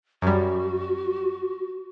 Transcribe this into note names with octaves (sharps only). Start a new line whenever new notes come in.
F#2 G3 F#4